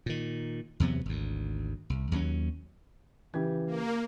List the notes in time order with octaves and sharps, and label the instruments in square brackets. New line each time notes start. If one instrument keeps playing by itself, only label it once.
[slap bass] A#2 D#3
E2 C3 F#3 B3
G#1 D2
C2
D#2 F#3 G3 C#4
[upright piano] C#3 G4 G#6 [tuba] E3
[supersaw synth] A#3